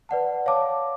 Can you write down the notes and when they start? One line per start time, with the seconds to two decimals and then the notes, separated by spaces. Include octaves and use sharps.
0.09 B4 D5 F#5 A5
0.46 C#5 F5 A5 D6